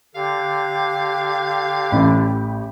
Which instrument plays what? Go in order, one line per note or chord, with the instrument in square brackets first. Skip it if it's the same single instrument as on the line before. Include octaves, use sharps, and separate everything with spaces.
[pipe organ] D3 [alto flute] G4 [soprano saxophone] F5
[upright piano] A1 B5